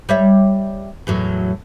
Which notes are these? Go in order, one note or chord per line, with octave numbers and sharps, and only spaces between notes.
G3 C#5 E5
E2 A2 F#3